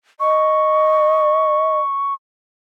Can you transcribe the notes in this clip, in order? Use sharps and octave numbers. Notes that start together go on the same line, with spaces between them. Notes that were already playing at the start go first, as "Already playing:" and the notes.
D#5 C#6